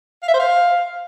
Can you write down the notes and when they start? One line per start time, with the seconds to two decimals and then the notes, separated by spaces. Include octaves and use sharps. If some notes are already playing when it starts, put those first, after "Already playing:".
0.23 F5
0.28 E5
0.34 C5
0.39 F5